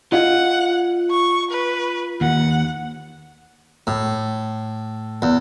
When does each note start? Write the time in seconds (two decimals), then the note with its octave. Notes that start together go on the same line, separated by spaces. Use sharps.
0.12 F4 D#5 F5 F#5
1.10 C#6
1.51 B4
2.21 D#2 F#5
3.87 A2
5.22 E2